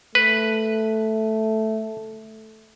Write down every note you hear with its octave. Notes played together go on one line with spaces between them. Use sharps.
A3 B4